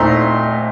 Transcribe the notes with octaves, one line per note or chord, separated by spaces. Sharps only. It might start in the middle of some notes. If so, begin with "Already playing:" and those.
Already playing: A#2 A3 C4 D#4 A#5 C6